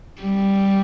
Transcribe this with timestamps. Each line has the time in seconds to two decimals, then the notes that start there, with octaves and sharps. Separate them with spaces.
0.22 G3